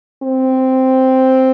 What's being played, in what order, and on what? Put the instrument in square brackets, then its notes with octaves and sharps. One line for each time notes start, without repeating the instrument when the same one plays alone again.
[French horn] C4